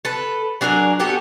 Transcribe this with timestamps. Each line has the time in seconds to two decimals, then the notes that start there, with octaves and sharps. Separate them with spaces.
0.05 A4 B4
0.61 F#3 D4 G#4 A#4
0.99 B3 F#4 G4 A4